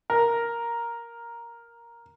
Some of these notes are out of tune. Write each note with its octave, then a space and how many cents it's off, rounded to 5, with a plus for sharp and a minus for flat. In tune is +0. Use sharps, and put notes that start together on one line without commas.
A#4 +5